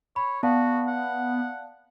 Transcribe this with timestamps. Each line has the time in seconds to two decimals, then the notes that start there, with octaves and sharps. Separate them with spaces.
0.16 C#5 B5
0.43 B3 F#4 D5 F5 A5
0.87 F#5